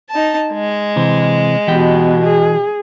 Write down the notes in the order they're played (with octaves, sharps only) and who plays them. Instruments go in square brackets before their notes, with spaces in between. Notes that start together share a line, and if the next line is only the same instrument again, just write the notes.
[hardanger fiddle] D#4 A5
G#3
[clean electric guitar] C3 E3 C5
[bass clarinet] B2 [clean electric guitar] E3 G4 G5 [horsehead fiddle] B3
[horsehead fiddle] G#4